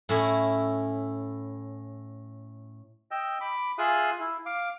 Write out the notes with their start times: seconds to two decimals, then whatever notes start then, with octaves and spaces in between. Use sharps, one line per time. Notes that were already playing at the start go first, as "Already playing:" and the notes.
0.09 A2 C#4 E4
3.11 D#5 G5 E6
3.41 B5 D6
3.78 F4 G#4 E5 F5 D#6 F#6
4.20 E4
4.46 F5 D6